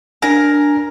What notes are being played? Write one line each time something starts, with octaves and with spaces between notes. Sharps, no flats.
D4 A#4 G#5